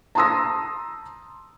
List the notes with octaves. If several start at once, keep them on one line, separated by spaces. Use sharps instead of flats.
A5 A#5 C6 D#6 E6 A#6